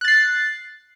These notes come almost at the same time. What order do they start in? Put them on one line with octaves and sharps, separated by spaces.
F#6 A6 C7